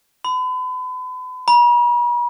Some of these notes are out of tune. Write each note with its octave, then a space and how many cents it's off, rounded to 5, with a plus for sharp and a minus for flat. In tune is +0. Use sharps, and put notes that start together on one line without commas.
B5 +40
B5 -45